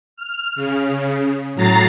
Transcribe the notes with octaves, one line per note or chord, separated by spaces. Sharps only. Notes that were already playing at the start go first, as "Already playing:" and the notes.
F6
C#3
A2 F#3 A#5 A6 C7